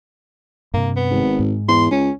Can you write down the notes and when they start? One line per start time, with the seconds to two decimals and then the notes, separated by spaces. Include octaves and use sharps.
0.74 G2 C3 A#3
0.96 B3
1.11 G#1
1.39 G#2
1.68 E2 C6
1.91 C#2 C#4